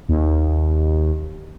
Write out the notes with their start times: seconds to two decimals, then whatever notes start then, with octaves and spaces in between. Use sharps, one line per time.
0.09 D#2